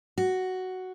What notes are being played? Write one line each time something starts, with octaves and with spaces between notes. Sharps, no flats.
F#4